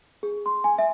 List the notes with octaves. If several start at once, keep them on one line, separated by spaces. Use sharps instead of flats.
G#4
C6
G#5
E5